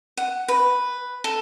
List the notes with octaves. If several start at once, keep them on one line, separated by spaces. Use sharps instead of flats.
F#5
B4
A4